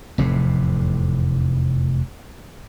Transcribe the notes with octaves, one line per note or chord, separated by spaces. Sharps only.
F1 E2 A2 C3